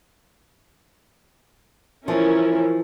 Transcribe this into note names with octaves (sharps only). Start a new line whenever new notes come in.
E3 F3 C#4 E4 A#4